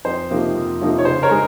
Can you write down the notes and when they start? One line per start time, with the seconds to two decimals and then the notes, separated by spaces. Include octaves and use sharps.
0.05 F2 C5
0.30 C3 F3 A#3 D#4
0.55 F2
0.81 C3 F3 A#3 D#4
0.98 C#5
1.05 C#3 C5
1.23 A#4 C#5
1.31 G#3